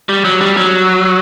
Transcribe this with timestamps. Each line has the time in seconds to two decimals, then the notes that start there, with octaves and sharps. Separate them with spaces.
0.09 G3
0.24 F#3
0.41 G3
0.57 F#3